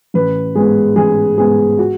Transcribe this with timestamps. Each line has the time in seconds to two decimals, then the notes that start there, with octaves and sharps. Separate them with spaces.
0.14 A1 B4
0.55 G#2 G#3 B3 G#4
0.96 A1 G#4
1.37 G#2 G#3 B3 G#4
1.79 F#4